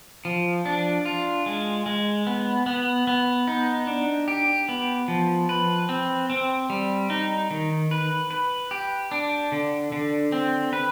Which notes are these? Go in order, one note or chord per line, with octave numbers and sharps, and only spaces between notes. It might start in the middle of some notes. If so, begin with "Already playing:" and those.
F3
D4
F4
G#3
G#3
B3
B3
B3
D#4
D4
G4
B3
F3
B4
C4
C4
G3
D#4
D#3
B4
B4
G4
D4
D3
D3
C4
B4